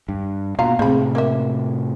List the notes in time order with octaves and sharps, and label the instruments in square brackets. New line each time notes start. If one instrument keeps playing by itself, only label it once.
[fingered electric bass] G2
[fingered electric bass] B2 [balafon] A#3 [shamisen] F4 F5 A#5
[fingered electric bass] A2 C3 [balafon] C4 G#4 [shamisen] C5 B5
[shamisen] A#3 E5 [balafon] A#4 D6